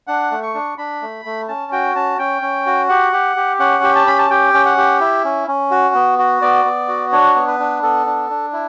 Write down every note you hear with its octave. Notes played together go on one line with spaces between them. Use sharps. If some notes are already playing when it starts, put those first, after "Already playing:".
D4 F#5
A3
C#6
D4
D4 B5
A3
A3
C#4 A5
F#4 G5
C#4 A5
C#4 G5
C#4
F#4
G4 F#5
G4
G4
C#4 F#5
G4
A5
C#4 B5
A5
G4 G5
C#4
F#5
G4
E4
C#4
C#4
F#4
B3
F#4
B3 D5
B3
F#4
D4 C#5
B3
B4
D4
B3 A4
D4
D4
E4